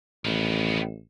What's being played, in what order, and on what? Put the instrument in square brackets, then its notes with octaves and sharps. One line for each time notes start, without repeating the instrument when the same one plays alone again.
[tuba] A1 [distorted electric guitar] D#3 B3